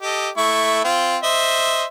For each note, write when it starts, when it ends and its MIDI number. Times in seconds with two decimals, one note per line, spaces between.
0.01 0.29 67
0.01 0.29 69
0.01 0.29 75
0.37 0.80 57
0.37 0.80 64
0.37 0.80 85
0.84 1.17 60
0.84 1.17 65
1.23 1.84 72
1.23 1.84 75
1.23 1.84 76